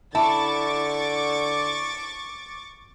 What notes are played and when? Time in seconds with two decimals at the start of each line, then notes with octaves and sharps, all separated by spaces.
0.15 D3 E4 A5 C#6 D6 A6